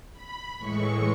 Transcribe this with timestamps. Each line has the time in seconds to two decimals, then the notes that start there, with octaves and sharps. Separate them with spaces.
0.12 B5
0.57 A2 E3 G#3 C#6